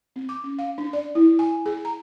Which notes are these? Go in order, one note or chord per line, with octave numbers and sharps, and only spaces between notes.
C4
D6
C#4
F5
D4
D5
E4
G#5
G#4
A#5